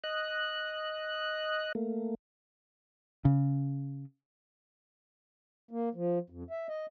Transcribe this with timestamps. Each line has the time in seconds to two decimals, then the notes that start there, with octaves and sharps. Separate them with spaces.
0.04 D#5 F#6
1.75 A3 A#3
3.25 C#3
5.71 A#3
5.95 F3
6.30 F2
6.50 E5
6.69 D#5